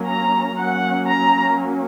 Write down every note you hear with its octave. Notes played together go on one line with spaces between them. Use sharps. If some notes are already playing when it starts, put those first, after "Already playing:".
Already playing: F#3 A#3 C#4
A#5
F#3 A#3 C#4 F#5
A#5